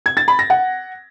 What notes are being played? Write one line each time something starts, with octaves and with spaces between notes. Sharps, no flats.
G#6
A6
B5
A#6
F#5